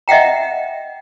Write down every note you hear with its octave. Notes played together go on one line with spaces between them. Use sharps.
D#5 E5 F#5 G5 A#5